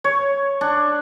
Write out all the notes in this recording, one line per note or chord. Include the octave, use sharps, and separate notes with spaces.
C#5
D4